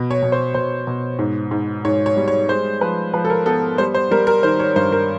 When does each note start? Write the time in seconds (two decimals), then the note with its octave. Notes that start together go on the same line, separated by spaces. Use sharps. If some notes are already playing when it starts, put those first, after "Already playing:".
Already playing: B2
0.11 C#5
0.22 B2
0.32 C5
0.54 B2 C5
0.87 B2
1.19 G#2
1.51 G#2
1.85 G#2 C#5
2.06 C#5
2.17 G3
2.28 C#5
2.49 G#3 C5
2.81 F3 B4
3.13 F3 B4
3.25 A4
3.30 A#4
3.46 B3 A4
3.78 G3 C5
3.95 C5
4.11 G3 A#4
4.27 A#4
4.43 D#3 C5
4.60 C#5
4.76 G2 C5
4.92 A#4